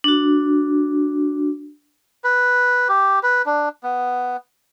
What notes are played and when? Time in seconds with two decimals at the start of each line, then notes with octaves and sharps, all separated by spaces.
0.04 D4 F#4
2.24 B4
2.89 G4
3.23 B4
3.46 D4
3.83 B3